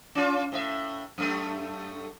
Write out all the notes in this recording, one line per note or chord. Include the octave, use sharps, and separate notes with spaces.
C#4 F4
A2 C5 E5
F#2 A3